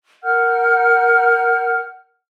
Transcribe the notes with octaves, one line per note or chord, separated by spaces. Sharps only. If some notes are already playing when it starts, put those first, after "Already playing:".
A#4 F#5 F6 G6